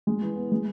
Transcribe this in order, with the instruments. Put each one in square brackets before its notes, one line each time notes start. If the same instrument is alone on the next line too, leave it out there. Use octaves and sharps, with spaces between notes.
[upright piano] G#3
E3
B3
G#3